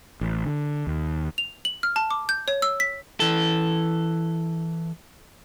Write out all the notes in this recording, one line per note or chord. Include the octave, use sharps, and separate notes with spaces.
A1
D3
D#2
F7
F#7
F6
A5
D6
G6
C#5
E6
B6
E3 A4